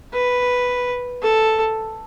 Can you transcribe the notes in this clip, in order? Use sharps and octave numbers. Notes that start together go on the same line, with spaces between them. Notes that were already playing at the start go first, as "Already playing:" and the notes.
B4
A4